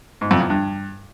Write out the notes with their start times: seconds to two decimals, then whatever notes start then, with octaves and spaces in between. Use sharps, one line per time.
0.21 G#2
0.31 F2
0.40 E2
0.50 G2